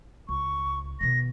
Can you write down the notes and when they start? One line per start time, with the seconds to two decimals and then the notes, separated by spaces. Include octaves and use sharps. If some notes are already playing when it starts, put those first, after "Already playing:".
0.29 C#2 C#6
1.01 B2 D#3 A#6